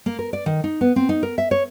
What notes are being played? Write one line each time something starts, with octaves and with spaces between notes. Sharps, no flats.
A#3
A#4
D5
D#3
D#4
B3
C4
D#4
A#4
E5
C#5